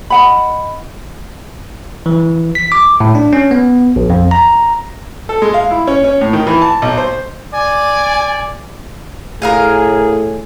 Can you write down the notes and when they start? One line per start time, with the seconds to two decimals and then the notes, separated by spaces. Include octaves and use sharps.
0.10 D#5 F#5 B5
2.06 E3
2.55 B6
2.72 D6
3.00 A2
3.15 D4
3.33 C#4
3.51 B3
3.96 A#1
4.10 F2
4.31 A#5
5.29 A4
5.42 G#3
5.54 F5
5.71 E4
5.87 C#4
6.04 C#4
6.21 A2
6.33 D#3
6.47 E3
6.61 A5
6.82 B1
6.98 C5
7.54 D5 G#5
9.42 A2 G#4 A#4 F5 G#5